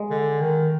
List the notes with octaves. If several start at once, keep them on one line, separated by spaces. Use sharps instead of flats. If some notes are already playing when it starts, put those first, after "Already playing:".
Already playing: G#3
D3
D#3